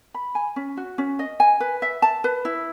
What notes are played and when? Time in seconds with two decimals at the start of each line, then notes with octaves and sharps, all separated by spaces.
0.14 B5
0.35 G#5
0.56 C#4
0.77 F#4
0.98 C#4
1.19 D#5
1.40 G#5
1.60 B4
1.82 E5
2.02 A5
2.24 B4
2.45 E4